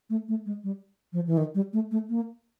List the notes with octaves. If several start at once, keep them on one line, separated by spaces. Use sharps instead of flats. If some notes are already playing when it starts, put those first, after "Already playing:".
A3
A3
G#3
G3
F3
E3
D#3
G3
A3
A3
A#3